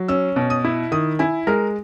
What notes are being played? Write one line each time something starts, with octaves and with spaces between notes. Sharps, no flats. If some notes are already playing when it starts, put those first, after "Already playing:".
Already playing: F#3
C#4 E6
B2
D#6
E4
D#3 D#6
E4 G#5
G#3 A#4